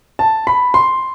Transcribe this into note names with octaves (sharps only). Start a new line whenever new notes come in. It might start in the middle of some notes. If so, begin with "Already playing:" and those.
A5
B5
C6